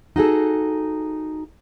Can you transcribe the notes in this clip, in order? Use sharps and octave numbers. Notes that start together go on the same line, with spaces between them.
D#4 F#4 G#4 A4